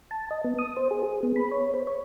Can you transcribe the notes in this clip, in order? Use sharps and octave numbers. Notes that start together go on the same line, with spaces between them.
A5
D#5
B3
D#6
C5
G#4
G#4
B3
B5
C#5
C5
C#5